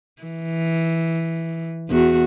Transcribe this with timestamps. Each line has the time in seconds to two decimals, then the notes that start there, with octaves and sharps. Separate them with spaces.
0.23 E3
1.90 E2 F#4